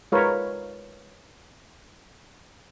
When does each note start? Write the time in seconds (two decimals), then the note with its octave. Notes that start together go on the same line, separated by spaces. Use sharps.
0.12 G#3 F4 A#4 B4 C#5